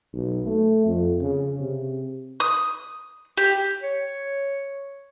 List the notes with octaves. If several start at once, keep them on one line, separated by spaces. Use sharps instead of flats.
B1
A3
F2
C#3
C3
D#6
G4
C#5